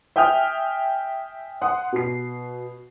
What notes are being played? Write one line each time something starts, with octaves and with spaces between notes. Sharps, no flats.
E5 G5 G#5 D#6 F6
F#5 C6 D#6
B2 C7